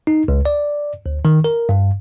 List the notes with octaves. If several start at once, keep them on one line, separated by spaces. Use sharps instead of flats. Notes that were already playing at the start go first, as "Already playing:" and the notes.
D#4
C#2
D5
D2
D#3
A#4
G2